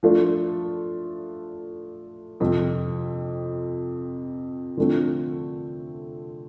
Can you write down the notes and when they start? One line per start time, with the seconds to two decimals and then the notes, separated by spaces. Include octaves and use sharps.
0.03 F3 A3 D4 F4 A4
2.40 F2 C3 F3 C4
4.77 D3 F3 A3 C4